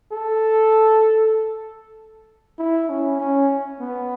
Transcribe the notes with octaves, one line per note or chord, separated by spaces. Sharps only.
A4
E4
C#4
C#4
B3